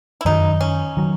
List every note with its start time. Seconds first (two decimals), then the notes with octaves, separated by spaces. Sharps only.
0.21 E4
0.25 F#2 D#3 F#3 D#4
0.61 C#4
0.97 D#3 F#3